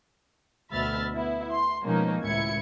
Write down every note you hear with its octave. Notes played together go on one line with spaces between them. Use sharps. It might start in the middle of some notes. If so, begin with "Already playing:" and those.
D2 B2 E5 B5 F6 A6
B3 E4
C6
B2 F3 G#3 A#3 C#4 D#4
G#1 C#2 A2 E4 G#6 C#7